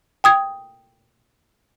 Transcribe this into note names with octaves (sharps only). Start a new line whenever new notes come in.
G5 D#6 G#6